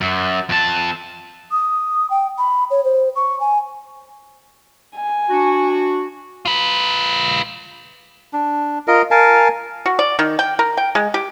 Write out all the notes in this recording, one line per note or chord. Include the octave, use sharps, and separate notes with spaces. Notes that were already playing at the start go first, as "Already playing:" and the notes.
F#2
F2 A5
D#6
G5
B5
C#5
C5
C#6
G#5
G#5
D4 F#4
F4 B4
D4
F4 A#4 D#5
A#4 F5 G#5 A5
F#4
D5
D#3
G5
A#4
G5
G#3
G4